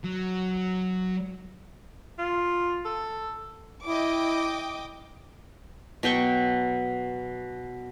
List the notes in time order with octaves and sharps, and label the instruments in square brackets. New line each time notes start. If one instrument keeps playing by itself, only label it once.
[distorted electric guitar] F#3
[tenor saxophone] F4
A4
[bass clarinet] E4 [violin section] D#5 G5 D6
[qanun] B2 F#3 G5 C#6